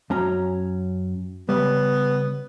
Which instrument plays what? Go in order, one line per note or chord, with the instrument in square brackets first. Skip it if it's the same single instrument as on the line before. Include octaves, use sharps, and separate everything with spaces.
[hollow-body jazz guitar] F#2 C#4 A#5
[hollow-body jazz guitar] C#3 G3 [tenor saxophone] B3